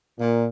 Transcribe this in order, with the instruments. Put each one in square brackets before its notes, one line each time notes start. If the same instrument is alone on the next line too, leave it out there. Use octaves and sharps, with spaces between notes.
[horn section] A#2